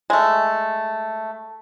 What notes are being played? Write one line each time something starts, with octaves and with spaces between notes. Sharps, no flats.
G#3 A3